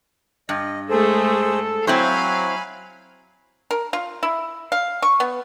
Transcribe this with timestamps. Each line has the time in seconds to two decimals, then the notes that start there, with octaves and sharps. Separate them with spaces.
0.49 G2 D#5
0.90 G#3 A3 G#4 A4 C5
1.87 F#3 C4 E4 C5 F5 G#5 B5
3.71 A#4
3.93 F4
4.23 E4
4.72 F5
5.02 C#6
5.20 B3